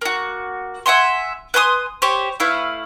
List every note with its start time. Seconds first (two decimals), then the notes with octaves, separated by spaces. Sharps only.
0.01 A#3 F#4
0.86 E5 F#5 G#5 C6
1.54 B4 G#5 C6 D#6
2.02 G4 C5 C#5
2.40 A3 E4 B4 F5